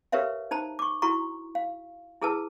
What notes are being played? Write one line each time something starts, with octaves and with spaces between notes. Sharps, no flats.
G4 A#4 B4 C#5 E5 F5
D#4 C5 A5 A#5
C#6 D6
E4 F#4 A4 A#5 C#6
F5
E4 G#4 A4 B4 A5 E6